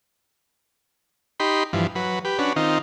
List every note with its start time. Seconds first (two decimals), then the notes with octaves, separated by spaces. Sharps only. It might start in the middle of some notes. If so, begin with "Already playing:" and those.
1.40 D#4 G4 B5 C6
1.73 G2 E3 F3
1.95 F#3 B4
2.25 G4 B4
2.39 C#4 D4 F#4 B4
2.56 D#3 C4 D#4 F4